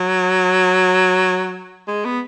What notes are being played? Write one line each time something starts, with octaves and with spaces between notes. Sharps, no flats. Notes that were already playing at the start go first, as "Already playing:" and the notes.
Already playing: F#3
G#3
B3